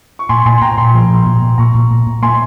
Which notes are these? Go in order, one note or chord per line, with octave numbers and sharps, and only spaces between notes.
C#6
A#2 G#5 C6
A#2 G#5 C6
A#2 G5 A#5
A#2 G#5 C6
F3
A#2
A#2
A#2
A#2 A#5 C#6
A#2
A#2
A#2
A#3 G#5 C6